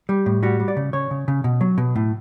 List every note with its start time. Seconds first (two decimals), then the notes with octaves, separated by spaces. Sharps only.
0.09 G3
0.26 A2
0.43 G3 F#4
0.60 G3
0.68 D5
0.77 C#3
0.93 C#3 C#5
1.11 C#3
1.28 C#3
1.44 B2
1.61 F#3
1.78 B2
1.96 A2